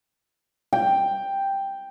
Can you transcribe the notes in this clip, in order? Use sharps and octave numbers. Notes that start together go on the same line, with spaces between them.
G5